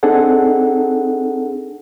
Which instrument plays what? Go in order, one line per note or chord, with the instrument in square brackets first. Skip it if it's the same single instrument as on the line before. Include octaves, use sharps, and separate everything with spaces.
[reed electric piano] C4 D4 D#4 G#4 A4 F#5